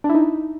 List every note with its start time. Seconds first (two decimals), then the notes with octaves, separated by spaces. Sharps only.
0.04 D4
0.09 E4
0.15 D#4